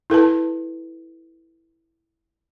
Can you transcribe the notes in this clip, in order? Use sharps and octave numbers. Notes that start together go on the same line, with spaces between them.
E4 A4 B4 A5